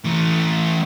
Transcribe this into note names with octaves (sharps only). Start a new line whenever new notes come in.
E3 A3